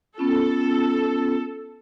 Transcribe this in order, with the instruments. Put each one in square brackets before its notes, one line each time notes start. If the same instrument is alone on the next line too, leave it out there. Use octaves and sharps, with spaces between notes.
[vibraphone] B3 C#4 F4 [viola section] A4